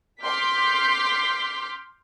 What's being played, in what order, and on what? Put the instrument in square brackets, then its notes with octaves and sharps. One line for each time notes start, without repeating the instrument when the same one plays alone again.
[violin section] C6 D6 F6 G6 B6